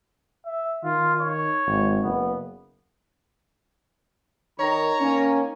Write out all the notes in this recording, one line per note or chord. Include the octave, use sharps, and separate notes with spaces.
E5
D#3 F4
C#5
G#1
F#1 B3
D#3 C#5 A#5
D#3 A#3 C#4